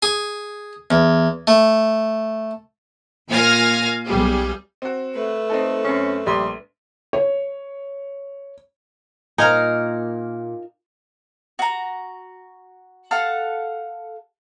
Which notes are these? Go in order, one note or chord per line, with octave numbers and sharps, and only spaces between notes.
G#4
E2
A3
A#2 F5 G#5 F6 A#6
B1 G3 G#4
C4 F#4
A3 B4
C4 D#4 A4
F#2 C4 C#4
A#1 G3 C6
C#5
A#2 D#4 A#4 F5 G#5
F#4 A#5
A4 F5 F#5